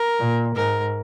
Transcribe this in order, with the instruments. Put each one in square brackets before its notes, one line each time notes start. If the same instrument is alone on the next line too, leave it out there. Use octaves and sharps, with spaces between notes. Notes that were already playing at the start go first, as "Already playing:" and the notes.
Already playing: [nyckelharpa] A#4
[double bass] A#2
[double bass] G#2 [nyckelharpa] A#4